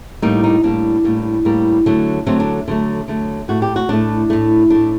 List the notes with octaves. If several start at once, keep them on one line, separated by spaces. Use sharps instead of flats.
A2 G3 A#3 D#4
D#4
A2 G3 A#3 D4
A2 G3 A#3
A2 G3 A#3
D3 F#3 A3
D3 F#3 A3 C4
D4
D3 F#3 A3
D3 F#3 A3
A2 A3 F#4
G4
F#4
A2 A3 D4
A2 A3
A2 A3 D4